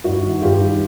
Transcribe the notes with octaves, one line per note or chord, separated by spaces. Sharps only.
G2 E4 F#4
D#3
G2 F4 G4
D#3